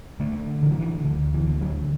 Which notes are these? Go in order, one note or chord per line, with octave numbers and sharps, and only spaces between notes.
D3 A3
D3 E3
F#3
E3
D2 D3
E3
D3
F#3